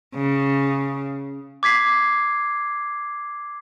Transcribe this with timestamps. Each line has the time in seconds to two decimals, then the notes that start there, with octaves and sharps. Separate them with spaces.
0.15 C#3
1.63 D6 G#6 B6 C7